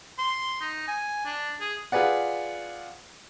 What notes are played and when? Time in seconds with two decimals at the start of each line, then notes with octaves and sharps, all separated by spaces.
0.19 C6
0.61 D#4
0.88 G#5
1.26 D4
1.61 G#4
1.92 F4 G#4 B4 D5 F#5